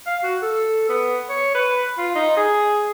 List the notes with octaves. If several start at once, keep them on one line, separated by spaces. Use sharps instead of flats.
F5
F#4
A4
B3
C#5
B4
F4
D#4
G#4